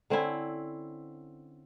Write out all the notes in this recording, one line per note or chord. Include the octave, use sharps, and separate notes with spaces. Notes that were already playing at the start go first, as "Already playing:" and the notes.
D3 C4 C#4 E4